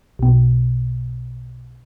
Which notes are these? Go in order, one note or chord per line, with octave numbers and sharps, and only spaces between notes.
B1 B2